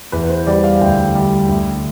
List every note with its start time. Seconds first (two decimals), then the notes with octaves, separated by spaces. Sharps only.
0.12 E2 B4
0.30 C5
0.46 G3 D5
0.64 F5
0.81 D2 G5
1.15 G3
1.49 D2